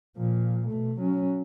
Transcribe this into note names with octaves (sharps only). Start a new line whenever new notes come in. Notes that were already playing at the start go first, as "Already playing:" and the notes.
A#2 F3
B2 A3
F#3 C#4